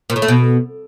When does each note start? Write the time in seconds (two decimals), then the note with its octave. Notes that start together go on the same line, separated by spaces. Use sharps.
0.10 A#2
0.16 A2
0.22 A3
0.28 B2